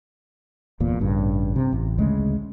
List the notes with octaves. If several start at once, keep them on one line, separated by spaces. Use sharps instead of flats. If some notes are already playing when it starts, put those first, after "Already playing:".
G1 E2 A#2
A1 G2 C#3
C3
A1
D2 C#3 G#3 A3